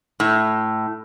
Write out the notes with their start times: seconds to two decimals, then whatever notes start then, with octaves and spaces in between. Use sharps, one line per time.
0.20 A2